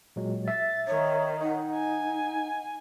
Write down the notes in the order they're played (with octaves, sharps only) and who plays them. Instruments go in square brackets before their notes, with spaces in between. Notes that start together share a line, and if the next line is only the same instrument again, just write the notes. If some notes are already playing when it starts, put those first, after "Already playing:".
[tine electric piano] A#2 F#3 G#3
[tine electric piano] E5 B6 [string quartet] A6
[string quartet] D#3 [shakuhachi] C#5
[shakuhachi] D#4 [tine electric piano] D#5 F#5
[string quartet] G#5